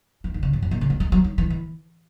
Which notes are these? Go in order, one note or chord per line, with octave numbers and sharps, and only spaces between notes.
E3
D#3
C#3
G#2
F#2
A#2
C#3
G#3
G#3
F#3
D#3
E3
E3